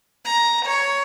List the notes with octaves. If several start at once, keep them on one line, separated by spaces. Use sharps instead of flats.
A#5
C#5